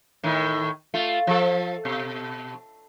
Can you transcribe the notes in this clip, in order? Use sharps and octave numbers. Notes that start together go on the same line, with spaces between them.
A2 D#3
A3 F4
F3 A4
B2